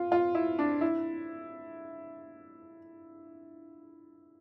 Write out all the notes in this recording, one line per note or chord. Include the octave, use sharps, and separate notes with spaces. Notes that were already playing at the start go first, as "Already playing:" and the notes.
Already playing: F4
F4
E4
D4
E4